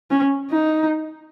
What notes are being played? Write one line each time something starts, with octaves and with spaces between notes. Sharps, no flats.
C#4
D#4